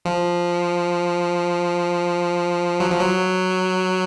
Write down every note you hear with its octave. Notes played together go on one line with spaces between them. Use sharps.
F3
F#3
F3
F#3